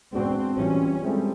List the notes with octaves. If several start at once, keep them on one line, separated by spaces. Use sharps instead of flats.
G#3 B3 C4 D4 F#4
E3 G3 C4 C#4 F4
G3 G#3 C4 E4 A4